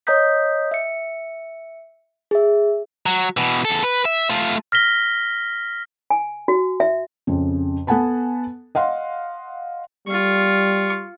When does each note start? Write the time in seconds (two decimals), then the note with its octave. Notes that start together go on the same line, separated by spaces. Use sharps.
0.07 C#5 D#5 A#5 D#6 G6 B6
0.71 E5 C#7
2.31 G#4 E5
3.06 F#3
3.37 B2 E3
3.65 E2 A4
3.83 B4
4.05 E5
4.30 A3 F4
4.72 F6 A#6 B6 G7
6.10 G#5
6.48 F#4
6.80 E5
7.27 F2 C#3
7.87 B3 A4 F#5 G#5 A5 B5
8.75 D#5 F5 F#5 C6
10.07 G3 F4 C#6